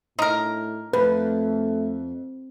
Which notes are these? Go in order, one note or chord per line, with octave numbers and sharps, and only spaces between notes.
A2 D4 D#4 A#4
F2 A3 B4